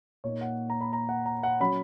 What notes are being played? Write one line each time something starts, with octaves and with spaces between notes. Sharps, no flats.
A#2 A#3 D#4 C#5
F#5
A#5
B5
A#5
F#5
A#5
F#5
F#3 C#4 B5